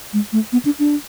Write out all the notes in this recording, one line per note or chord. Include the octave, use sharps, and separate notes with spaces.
G#3
A3
B3
D4
D4